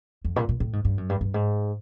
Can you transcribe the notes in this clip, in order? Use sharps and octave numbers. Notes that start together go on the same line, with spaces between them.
F2
A#2
A#2
A2
G#2
G2
F#2
G2
G2
G#2